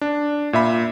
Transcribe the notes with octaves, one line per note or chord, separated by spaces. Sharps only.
D4
A#2 E5 B5